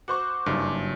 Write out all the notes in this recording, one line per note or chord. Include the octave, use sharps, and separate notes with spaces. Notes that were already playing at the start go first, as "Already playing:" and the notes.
F#4 C5 C#6 D6
F#1 G2